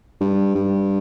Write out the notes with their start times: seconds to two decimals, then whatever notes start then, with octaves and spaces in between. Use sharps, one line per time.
0.21 G2
0.55 G2